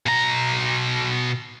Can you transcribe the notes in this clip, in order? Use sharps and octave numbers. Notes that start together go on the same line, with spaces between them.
B2 A#5